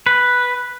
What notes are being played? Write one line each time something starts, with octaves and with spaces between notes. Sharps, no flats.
B4